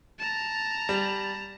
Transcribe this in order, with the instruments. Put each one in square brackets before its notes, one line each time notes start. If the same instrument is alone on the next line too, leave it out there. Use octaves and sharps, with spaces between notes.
[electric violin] A5 A#5
[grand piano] G3